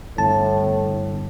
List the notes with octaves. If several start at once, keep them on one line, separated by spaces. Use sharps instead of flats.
G1 A2 A5